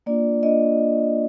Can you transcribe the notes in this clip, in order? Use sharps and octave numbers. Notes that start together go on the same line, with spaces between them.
A#3 D4 F4 D5
A#3 D4 F4 D#5